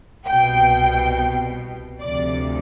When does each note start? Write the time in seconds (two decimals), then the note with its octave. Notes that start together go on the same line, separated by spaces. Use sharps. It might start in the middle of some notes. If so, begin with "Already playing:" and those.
0.25 C2 B2 G5
2.00 D2 C3 F3 D5